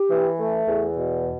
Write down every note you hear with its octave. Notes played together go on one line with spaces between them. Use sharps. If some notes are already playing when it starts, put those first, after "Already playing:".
Already playing: G4
E3
A3
E2
B2